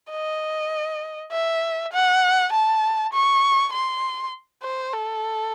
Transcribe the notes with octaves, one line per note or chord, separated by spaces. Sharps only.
D#5
E5
F#5
A5
C#6
C6
C5
A4